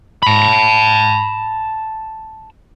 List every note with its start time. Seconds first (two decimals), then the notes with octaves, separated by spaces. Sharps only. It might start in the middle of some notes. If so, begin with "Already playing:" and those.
0.23 A5 B5